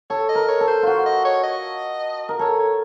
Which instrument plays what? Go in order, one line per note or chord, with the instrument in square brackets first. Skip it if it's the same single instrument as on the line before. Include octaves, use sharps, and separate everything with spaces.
[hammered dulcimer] A4 [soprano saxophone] C#5
[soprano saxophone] D#5
[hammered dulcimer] A#4
[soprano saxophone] C#5
[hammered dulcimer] A4
[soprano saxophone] C5
[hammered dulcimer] F4 F#4 [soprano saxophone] C5
[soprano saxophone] D#5
C#5
D#5
[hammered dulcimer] A#4
[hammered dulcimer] A4 [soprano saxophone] C#5
[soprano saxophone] C#5